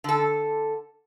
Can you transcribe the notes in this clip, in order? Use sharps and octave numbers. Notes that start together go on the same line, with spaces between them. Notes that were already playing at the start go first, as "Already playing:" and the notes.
D3 A4